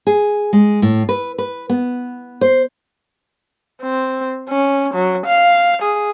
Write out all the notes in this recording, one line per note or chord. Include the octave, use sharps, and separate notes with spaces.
G#4
G#3
A2
B4
B4
B3
C5
C4
C#4
F#3
F5
G#4